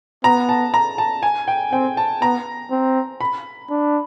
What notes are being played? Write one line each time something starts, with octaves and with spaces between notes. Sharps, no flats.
B3 A#5
A5
A#5
A5
G#5
G5
C4 G5
A5
B3 A#5
C4
B5
D4